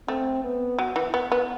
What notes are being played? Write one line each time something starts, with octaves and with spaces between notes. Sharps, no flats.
A3 C4
B3
F#3
E3
B3
B3